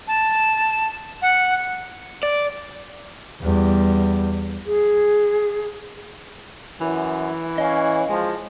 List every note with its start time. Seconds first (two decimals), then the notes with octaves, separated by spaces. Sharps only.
0.08 A5
1.22 F#5
2.23 D5
3.41 E2 G3
4.66 G#4
6.81 F#2 E3
7.58 C#4 D#5 F5
8.09 F3 G#3